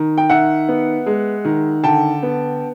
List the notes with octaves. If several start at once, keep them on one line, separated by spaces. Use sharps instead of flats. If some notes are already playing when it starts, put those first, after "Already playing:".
Already playing: D#3
G5
D#3 E5 F#5
B3
G#3
D#3
D3 G5 A5
B3